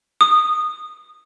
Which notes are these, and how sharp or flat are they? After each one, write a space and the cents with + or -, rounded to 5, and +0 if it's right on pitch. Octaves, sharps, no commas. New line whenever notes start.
D#6 -15